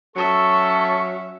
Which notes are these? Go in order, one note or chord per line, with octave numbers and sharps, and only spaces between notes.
F#3 C#4 A4 E5 C#6